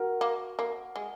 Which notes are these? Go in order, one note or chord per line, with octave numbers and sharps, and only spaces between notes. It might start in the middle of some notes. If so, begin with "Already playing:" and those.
Already playing: F#4 A#4
A#3
A#3
G#3